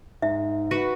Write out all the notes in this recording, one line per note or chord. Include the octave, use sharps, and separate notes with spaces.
G#2 E5
F#4 B4